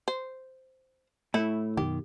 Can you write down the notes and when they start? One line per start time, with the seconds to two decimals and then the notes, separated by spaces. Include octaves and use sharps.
0.08 C5
1.34 A2 A3 E4
1.77 F#2 B2 D#3 G4